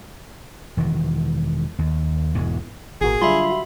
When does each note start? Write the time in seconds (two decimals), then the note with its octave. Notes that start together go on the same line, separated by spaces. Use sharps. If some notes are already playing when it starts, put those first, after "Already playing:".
0.77 E1 D#3 E3
1.79 D#2
2.35 E1 E2 G#2 E3
3.01 G#1 A#2 F#4 G#4 A#4
3.21 D3 F#3 G3 F4 E5 B5 C6
3.50 F#4